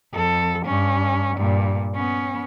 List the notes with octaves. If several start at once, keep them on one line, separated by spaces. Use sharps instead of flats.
F2 A4
G2 C#4
G2 A#2
B3 C#4